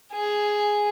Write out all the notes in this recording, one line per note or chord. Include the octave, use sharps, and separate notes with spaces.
G#4